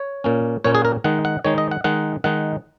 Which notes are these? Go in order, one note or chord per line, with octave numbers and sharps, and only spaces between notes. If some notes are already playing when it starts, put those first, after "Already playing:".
Already playing: C#5
A#2 A#3 C#4
A#2 A#3 C#4 C#5
G#4
A#4
D#3 G#3 D#4 F#5
F#5
D#3 G#3 D#4 C#5
D#5
F#5
D#3 G#3 D#4 F#5
D#3 G#3 D#4 F#5